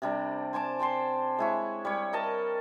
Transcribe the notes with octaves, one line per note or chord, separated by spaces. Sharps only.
C3 G3 D4
C5 G#5 A5 D6
C5 G5 A5 C6
G#3 E4 C#5
G3 C#5
A#4 D#5 A5